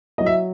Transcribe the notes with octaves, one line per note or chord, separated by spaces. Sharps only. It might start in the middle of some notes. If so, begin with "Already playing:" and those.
F#3 D#5
E5